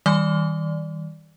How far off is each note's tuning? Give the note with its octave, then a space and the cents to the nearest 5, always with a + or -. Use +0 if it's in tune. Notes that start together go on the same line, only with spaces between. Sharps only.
D#3 +35 G3 -5 D5 +0